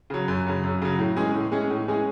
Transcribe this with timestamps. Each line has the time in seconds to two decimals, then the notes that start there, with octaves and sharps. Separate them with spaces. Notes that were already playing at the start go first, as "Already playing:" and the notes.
0.10 C#3 F#3
0.28 F#2
0.46 C#3 F#3
0.64 F#2
0.82 C#3 F#3
0.99 A2
1.16 E3 G#3 C#4 G#4
1.34 A2
1.52 E3 G#3 C#4 G#4
1.70 A2
1.88 E3 G#3 C#4 G#4